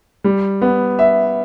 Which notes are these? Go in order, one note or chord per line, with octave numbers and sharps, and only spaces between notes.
G3
B3
E5